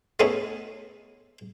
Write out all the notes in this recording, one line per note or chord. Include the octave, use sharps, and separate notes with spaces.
G#3 A3 B3 C#4 D#4 E4